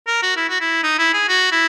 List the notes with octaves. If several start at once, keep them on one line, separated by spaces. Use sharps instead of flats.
A#4
F#4
E4
F#4
E4
D#4
E4
G#4
F#4
E4